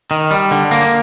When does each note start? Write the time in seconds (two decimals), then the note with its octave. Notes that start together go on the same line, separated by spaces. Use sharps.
0.11 D#3
0.31 G3
0.51 D3
0.71 A#3